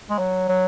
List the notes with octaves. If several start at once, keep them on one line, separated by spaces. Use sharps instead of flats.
G#3
F#3
F#3